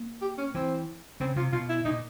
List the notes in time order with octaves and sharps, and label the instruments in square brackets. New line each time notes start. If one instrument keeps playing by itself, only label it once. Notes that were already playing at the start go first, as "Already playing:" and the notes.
Already playing: [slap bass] A#3
[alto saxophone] G4
C#4
[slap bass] E3 [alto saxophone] C4
[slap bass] C#3 [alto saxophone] C4
[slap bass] C3 [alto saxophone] F4
[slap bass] B2 [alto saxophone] F4
[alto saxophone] E4
[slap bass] A#2 [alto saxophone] D#4